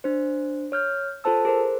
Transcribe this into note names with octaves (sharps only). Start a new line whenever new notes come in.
D4 C5
C#5 F6 G6
F4 A4 C5 A5 E6
G#4 A#4 C5